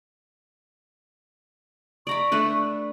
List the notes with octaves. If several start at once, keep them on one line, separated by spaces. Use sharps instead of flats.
D5 A#5 B5 C#6
A3 D4 B4